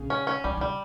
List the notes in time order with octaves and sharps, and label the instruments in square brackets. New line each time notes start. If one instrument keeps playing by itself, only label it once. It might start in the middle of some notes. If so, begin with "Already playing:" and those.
Already playing: [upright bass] C#3
[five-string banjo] C#4
C#4
[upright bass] D3 [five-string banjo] G3
[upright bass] C#3 [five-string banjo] G3